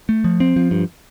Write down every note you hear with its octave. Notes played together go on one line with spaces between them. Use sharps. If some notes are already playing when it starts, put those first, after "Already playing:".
A3
F3
C4
F3
G2